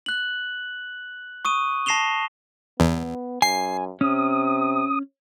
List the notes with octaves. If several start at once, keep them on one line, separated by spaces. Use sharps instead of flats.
F#6 F#7
C#6 D#6 D#7
A5 A#6 C7 E7 F7 G7
E2 B3
F#2 G#5 C7
C3 C#4 D#6